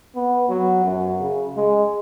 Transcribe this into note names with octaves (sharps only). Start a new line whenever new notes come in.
B3
F#3
F#2
C#3
G#3